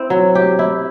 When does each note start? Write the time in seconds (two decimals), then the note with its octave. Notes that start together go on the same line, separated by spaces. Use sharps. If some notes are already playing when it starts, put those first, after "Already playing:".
Already playing: C4 E4
0.10 F#3
0.35 G4
0.59 E4